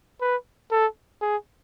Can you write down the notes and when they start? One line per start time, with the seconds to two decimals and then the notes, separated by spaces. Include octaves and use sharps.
0.21 B4
0.71 A4
1.21 G#4